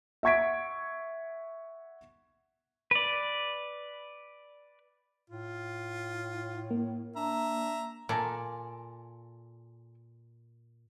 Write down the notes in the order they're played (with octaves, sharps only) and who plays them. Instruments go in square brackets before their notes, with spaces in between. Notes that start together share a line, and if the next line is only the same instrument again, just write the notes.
[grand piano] E5 F#5 C#6 G#6 B6 D7
[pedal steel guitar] B4 D5
[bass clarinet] A2 [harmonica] F4
[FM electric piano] A#3
[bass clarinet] D4 [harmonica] E5 A#5
[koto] A#2 [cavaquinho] A4 G#5 D6